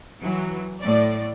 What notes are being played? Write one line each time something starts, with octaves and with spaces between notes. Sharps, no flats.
E3 F#3
A2 D5